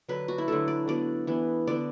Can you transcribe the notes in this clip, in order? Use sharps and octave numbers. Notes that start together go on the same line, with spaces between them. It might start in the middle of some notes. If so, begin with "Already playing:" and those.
D3 F#3 D4 B4
F#4
E4
D3 F#3 A3 D4 A4
D5
D3 F#3 B3 D5
E3 B3 D4
D3 B3 D4 D5